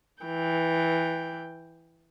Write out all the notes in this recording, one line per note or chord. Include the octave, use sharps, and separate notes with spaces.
E3 G5